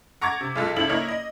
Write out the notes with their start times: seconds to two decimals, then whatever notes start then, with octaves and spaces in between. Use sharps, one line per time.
0.21 F#5 A#5 C#6 D6 G#6 A6
0.41 C3
0.56 B1 G#3 F4 A4
0.76 G#1 C#2 E4 A4 F#7
0.89 A#3 E4 A#4 C#5 D#5
1.08 D#5